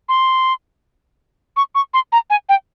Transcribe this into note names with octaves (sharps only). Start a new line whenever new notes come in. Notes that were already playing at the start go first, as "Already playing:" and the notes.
C6
C#6
C#6
C6
A#5
G#5
G5